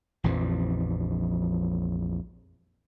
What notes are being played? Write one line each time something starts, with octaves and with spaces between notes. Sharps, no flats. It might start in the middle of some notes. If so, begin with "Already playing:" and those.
A#1 F2 E3 F3